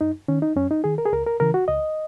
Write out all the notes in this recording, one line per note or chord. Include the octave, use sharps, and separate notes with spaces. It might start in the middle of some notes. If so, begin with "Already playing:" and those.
F#2 D#4
D#3 C#4
D#4
F#2 C#4
D#4
D#3 G#4
A#4
G#4
C#2 A#4
A#4
C#3 E3 A#4
F#4
C#2 D#5